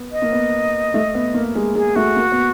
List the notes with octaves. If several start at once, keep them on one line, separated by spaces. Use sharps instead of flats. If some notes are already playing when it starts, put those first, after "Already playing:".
Already playing: B3
D#5
A#3
B3
A3
B3
A#3
G#3
G#3 G#4
A3 F#4
A#3
B3